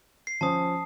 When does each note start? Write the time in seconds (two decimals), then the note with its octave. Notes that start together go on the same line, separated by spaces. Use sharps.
0.27 C7
0.41 F3 C#4 C5 A5 D#6